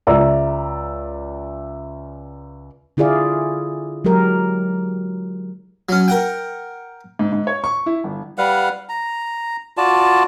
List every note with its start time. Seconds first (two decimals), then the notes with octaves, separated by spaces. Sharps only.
0.07 C#2 D5 E5 A#5
2.97 D3 E4 F4 G#4 D5 F5
4.05 F#3 G#3 G4 A#4
5.89 F#3 C#4
6.08 A#4 F#5 G5
7.19 G#2
7.32 G#2
7.47 C#5
7.64 C#6
7.86 E4
8.04 G1
8.38 G3 B4 F5 F#5
8.89 A#5
9.77 F4 F#4 D5 A5